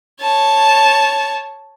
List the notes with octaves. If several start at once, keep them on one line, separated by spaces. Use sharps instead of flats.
C#5 A5